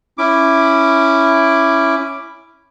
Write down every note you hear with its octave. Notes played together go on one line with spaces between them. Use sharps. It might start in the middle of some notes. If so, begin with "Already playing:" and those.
C#4 E4 D6